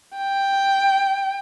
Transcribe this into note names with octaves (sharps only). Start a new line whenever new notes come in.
G5